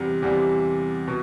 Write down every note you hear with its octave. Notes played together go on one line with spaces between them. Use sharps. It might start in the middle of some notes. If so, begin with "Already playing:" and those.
Already playing: E2 C3 G3
E2 C3 G3
B2